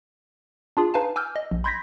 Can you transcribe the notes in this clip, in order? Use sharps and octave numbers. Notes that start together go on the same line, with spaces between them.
D4 F4 G#4
D#4 B4 F5 G#5 A5
G#5 D6 E6 F6 G6
D#5
A#1
B5 C6 G6 G#6 A#6 B6